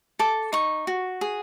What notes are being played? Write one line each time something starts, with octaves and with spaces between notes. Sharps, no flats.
A4 D6
D#4 C#6
F#4
G#4